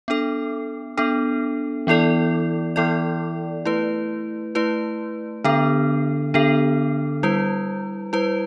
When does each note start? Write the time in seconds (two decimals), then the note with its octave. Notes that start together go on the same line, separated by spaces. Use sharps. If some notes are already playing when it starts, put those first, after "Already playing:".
0.08 B3 D4 A4
0.97 B3 D4 A4
1.87 E3 B3 E4 A4 D5
2.76 E3 B3 E4 A4 D5
3.65 A3 E4 B4
4.55 A3 E4 B4
5.44 D3 B3 D4 A4
6.34 D3 B3 D4 A4
7.23 G3 E4 B4
8.13 G3 E4 B4